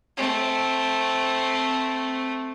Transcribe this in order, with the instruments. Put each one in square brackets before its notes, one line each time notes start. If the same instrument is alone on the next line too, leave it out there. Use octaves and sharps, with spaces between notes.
[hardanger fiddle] A3 C4